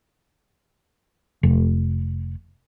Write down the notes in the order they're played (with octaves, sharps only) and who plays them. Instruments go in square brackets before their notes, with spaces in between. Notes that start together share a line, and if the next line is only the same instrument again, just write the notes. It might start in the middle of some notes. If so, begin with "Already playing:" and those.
[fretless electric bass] F1